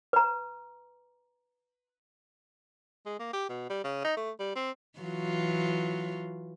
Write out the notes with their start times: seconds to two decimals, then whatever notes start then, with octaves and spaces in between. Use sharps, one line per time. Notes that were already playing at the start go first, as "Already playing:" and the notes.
0.13 B4 A#5
3.06 G#3
3.19 A#3
3.33 G4
3.49 B2
3.69 G3
3.84 C#3
4.04 D#4
4.17 A3
4.39 G3
4.55 C4
5.00 E3 F#3 F4